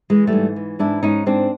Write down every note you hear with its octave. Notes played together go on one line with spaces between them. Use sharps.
E3 G#3
G3 A3
G#2
E3
G#2 D4 E4
G#2 C#4 D#4
G#2 C4 D4